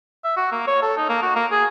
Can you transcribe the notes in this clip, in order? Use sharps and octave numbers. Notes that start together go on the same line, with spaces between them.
E5
F#4
A#3
C#5
A4
D#4
A#3
F#4
A#3
G#4